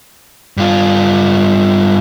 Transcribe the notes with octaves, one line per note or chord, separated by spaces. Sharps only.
G2 F4